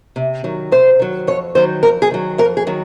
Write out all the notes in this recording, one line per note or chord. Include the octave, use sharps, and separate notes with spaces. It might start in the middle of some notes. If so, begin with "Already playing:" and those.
C3
D#3 F#3
C3 C5
D#3 F#3
F2 C#5
D#3 F#3 C5
F2 A#4
G#4
D#3 F#3
F2 A#4
G#4
D#3 F#3